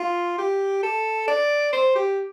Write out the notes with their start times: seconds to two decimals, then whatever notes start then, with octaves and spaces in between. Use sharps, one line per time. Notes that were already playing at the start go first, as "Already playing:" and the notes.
Already playing: F4
0.38 G4
0.83 A4
1.28 D5
1.73 C5
1.96 G4